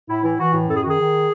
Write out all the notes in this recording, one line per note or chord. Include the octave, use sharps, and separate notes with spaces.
A2 E4
E3 E4
E3 F#4
A2
F#2 A4
G#4
D#3 F#4
G#4
D#3